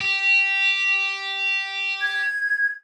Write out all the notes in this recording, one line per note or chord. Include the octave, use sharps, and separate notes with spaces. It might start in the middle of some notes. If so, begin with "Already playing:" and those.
G4
G#6